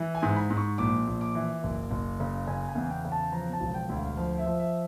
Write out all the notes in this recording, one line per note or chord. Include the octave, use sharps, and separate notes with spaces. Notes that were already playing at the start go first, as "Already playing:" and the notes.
Already playing: E3
G#5
G#2
B5
G#2
C#6
A#1 D6
A#1
D6
E3
F#1
F#1
C#3
C#3 G#5
G#5
E2
G5
C#3
A5
F3 A#5
A5
E1
G5
D2
F5
F3 F5
E5
F3
E5